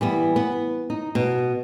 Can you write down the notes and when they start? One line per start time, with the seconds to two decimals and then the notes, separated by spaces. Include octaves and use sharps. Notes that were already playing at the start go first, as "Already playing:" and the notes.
0.01 E3 G3 B3
0.36 B3
0.90 D#4
1.15 B2